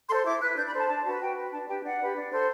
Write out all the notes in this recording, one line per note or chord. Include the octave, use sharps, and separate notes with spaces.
A4 C5 C6
E4 D6
B4 F#6
D4 G6
B5
A4 C5 A5
D4 A5
F#4 B4 A5
F#4 G5
B4
D4 A5
G4 B4 G5
D4 F#5
G4 B4
D4
A4 C5